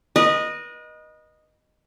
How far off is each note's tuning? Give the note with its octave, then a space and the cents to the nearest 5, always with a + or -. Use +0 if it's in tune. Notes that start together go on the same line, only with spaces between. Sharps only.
B4 -40 D#5 -10